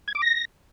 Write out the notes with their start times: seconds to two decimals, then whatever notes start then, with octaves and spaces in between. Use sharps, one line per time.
0.08 G#6
0.15 D6
0.22 A#6